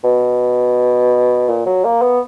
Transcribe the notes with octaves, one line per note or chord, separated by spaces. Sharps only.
B2
A#2
F#3
A#3
B3